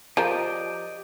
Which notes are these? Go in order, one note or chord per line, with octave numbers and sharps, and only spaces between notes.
F3 G4 A#4 D5 D#5